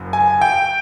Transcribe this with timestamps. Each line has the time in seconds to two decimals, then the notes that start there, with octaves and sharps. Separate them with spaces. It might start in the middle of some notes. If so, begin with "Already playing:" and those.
Already playing: F#1 F#2
0.13 G#5
0.41 G5